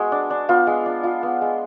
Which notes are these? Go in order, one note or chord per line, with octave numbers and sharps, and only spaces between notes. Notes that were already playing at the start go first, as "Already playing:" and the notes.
Already playing: G#3 B3 F#4
D4
D4
B3 F4
G#3
D4
F4
B3
G#3